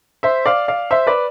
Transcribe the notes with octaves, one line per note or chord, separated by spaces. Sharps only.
C5 E5
D5 F5
D5 F5
C5 E5
B4 D5